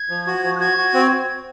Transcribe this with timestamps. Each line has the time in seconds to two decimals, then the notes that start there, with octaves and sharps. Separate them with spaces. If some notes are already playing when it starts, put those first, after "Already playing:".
Already playing: G#6
0.09 F3
0.27 F#4
0.43 F3
0.56 F#6
0.60 F#4 G#6
0.77 F#4
0.94 C4